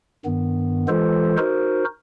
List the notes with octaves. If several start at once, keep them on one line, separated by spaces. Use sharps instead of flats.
G2 D#3 B3
E3 G#3 F4 A4 C5
D#4 F#4 A#4 C5